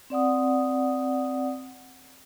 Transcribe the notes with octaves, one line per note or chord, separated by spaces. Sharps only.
C4 D5 F#5 D#6